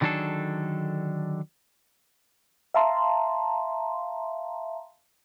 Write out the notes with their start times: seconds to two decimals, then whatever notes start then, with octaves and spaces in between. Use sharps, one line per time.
0.01 D3 D#3 F#3 D4 G#4 A4
2.74 E5 F5 A5 A#5 C6